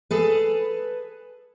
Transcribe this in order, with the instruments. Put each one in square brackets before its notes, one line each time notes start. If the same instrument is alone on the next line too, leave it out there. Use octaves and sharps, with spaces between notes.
[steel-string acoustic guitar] G#4 A4 B4